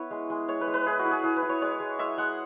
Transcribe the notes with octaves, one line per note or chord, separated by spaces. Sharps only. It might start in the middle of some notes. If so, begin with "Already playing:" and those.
Already playing: B3 E4 B4 C#5
G#3
G#3
G#3 C#5
B4
G#3
B4
E4 G#4
F#4
E4
G#4
E4 G#4
B4
E4
C#5
G#3 C#5
G#3
G#3 E5
G#3 F#5